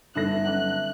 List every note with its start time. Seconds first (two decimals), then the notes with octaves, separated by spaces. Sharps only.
0.15 G1 G3 D#4 A4 E5 F#6 A#6
0.45 F#3 C#4 F#5